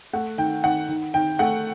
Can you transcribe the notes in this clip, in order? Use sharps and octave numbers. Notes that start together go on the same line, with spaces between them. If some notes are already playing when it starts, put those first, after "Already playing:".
A3 F#5
D#3 G5
D#3 F#5
D#3
D#3 G5
A3 F#5